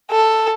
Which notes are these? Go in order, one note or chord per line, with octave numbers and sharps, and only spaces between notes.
A4